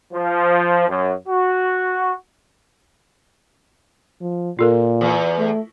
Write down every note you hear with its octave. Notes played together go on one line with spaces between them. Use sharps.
F3
F#2
F#4
F3
A#2 F4 A4 A#4
E2
A3